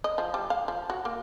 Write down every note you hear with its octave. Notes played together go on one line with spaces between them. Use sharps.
D#5
F3
G3
F5
F3
F#4
A#3